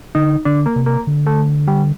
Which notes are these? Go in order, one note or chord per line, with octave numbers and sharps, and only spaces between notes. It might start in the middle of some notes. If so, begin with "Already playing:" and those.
D3 D#4
D3 D4
A#3
C3
A#3
D3
A3
G3